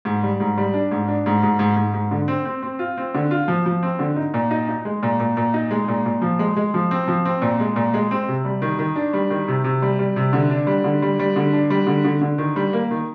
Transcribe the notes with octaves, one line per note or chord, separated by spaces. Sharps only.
G#2
G3
G#2
G3
D4
G#2
D4
G#2
G#2
G#2
G#2
G#2
D3
C4
C4
C4
F4
C4
D3
F4
F3
F3
C4
D3
D#4
A#2
D#4
D#4
G#3
A#2
A#2
A#2
D#4
G#3
A#2
A#2
F3
G#3
G#3
F3
C4
F3
C4
A#2
G#3
A#2
G#3
C4
C3
G3
D#3
D#3
D4
G3
D#3
C3
C3
G3
G3
C3
D3
D4
G3
D3
G3
G3
D3
D4
G3
D3
D3
D3
D#3
G3
A#3
D#3